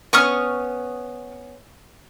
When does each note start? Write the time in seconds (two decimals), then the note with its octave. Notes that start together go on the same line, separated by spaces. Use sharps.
0.13 B3 C#4 C#6 D#6 F6